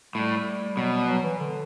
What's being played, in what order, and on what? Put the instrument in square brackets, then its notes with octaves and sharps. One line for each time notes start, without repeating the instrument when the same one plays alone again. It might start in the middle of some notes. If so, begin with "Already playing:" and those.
[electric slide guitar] A2 [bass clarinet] G3
[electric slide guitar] B2 [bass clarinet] F#3
[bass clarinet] G3
F#3
E3
D3